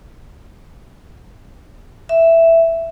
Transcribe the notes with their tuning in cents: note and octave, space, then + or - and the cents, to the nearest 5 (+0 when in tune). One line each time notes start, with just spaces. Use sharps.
E5 +5